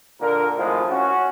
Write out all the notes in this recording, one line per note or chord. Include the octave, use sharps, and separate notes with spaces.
A#2 D3 A#4
G#1 A2 F3 G#3
C#4 F#4